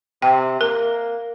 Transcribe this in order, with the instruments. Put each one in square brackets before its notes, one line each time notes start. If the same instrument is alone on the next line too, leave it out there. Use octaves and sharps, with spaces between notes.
[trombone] C3 [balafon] G5
[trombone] A#3 [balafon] A#4